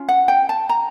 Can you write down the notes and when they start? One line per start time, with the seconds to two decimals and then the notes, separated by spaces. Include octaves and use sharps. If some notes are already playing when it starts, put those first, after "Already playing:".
Already playing: C#4 F4
0.09 F#5
0.28 G5
0.49 A5
0.69 A#5